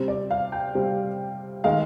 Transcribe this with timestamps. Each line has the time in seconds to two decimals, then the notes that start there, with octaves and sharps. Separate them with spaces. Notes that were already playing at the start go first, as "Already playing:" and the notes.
Already playing: C3 G3 C4
0.08 D5
0.31 F5
0.52 G5
0.75 C3 G3 C4
1.64 D#3 G#3 F5